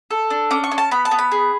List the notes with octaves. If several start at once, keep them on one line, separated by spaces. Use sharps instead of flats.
A4
D4
C#4 D6
C#6
C#4
A5
B3 B5
A5
B3
B5
G#4